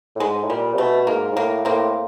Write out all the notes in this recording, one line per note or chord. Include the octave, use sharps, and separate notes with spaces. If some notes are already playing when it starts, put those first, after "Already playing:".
A2
G#2 G#3
A2
A#2 G3
C3
B2 A3
G#2 A#3
G#2
A2 A#3
A2 A#3 C4